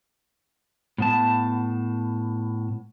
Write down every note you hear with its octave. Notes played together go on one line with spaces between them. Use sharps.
A2 B3 A5